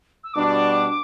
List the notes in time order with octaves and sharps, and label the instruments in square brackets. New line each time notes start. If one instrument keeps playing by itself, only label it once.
[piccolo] E6
[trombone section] B2 G3 D4 F#4 [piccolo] D6